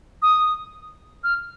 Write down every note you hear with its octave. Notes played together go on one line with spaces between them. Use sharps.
D#6
F6